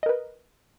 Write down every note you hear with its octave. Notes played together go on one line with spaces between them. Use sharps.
A#4 B4 D#5